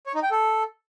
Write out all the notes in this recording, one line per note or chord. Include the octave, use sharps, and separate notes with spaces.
C#5
D#4
G5
A4